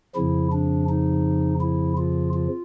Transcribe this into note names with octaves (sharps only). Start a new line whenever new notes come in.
F2 C#3 F3 E4
D4
D#4
E4
F4
F4